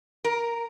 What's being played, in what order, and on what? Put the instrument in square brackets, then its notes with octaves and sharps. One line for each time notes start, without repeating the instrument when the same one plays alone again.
[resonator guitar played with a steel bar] A#4